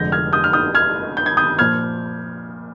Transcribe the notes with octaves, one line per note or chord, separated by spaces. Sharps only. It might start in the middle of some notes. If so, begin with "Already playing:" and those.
Already playing: F1 F2 D3 G#3 G6 A#6
F6 G#6
D#6 G6
F6
D#6 G6
F6 G#6
G6
G#6
D#6 G6
A#2 F3 F6 G#6